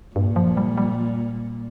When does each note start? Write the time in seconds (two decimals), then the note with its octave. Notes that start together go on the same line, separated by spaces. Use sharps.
0.16 G2 A#2
0.36 F3
0.57 G3
0.78 G3